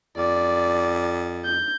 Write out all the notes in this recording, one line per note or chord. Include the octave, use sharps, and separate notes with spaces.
F2 D5
G6